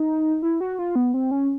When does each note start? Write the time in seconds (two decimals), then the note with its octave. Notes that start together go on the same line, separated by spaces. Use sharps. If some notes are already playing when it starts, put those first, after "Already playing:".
Already playing: D#4
0.42 E4
0.61 F#4
0.79 F4
0.96 B3
1.14 C4
1.31 C#4